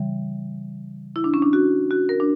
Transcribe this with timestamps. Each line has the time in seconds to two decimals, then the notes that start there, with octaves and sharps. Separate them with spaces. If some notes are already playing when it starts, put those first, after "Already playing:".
Already playing: C#3 E3 G3
1.16 E4
1.24 D4
1.34 C#4
1.42 D4
1.53 F#4
1.91 F#4
2.09 A#4
2.20 D4